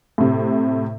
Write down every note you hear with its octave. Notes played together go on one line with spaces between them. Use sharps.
A2 C3